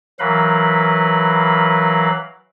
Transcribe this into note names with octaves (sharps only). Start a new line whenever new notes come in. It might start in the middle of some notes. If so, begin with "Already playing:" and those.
E3 F#3 A#4 B4 F5 B5